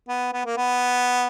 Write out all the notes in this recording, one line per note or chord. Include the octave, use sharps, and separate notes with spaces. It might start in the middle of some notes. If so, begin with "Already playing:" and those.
B3
B3
A#3
B3